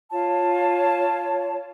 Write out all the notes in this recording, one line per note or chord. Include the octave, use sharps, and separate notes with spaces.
F4 C#5 A5